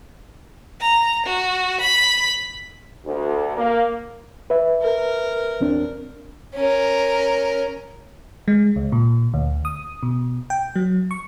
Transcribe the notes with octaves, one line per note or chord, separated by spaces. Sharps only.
A#5
F#4
B5
D2
A#3
B4 E5
A#4
E2 C4 D4
C#4 A#4
G#3
C#2
A#2
D2
D#6
B2
G5
F#3
C#6